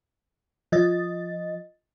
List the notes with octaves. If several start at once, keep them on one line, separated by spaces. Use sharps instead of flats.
F3 D#5 A6